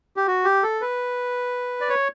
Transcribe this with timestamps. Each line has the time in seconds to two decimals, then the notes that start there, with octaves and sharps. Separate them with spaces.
0.16 G4
0.27 F#4
0.45 G4
0.63 A4
0.81 B4
1.81 D5
1.89 C#5